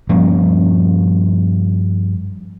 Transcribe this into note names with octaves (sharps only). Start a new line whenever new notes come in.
G2 F3 A#3 C#4